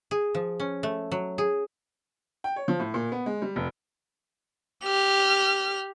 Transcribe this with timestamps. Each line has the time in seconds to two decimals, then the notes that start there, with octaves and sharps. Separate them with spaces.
0.11 G#4
0.35 F3
0.60 C#4
0.83 A3
1.12 F#3
1.38 G#4
2.44 G5
2.56 C#5
2.68 F3
2.80 A2
2.94 A#2
3.12 B3
3.26 G#3
3.42 G3
3.56 F1
4.84 G4 F6